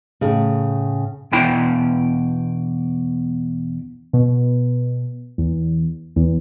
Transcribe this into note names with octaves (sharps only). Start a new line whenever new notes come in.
A2 C#3
E2 B2 D4 E4 G5 B5
B2
E2
E2